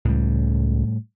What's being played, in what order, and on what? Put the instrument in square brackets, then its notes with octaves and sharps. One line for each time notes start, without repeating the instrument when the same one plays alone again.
[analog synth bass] C#2 [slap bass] A2 G3